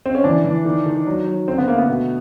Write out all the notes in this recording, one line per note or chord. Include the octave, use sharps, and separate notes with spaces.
C4
C#4
E3 D4
E3
D#3
D#3
F#3
F#3
D3 C4
B3
A3 A#3
B3
B2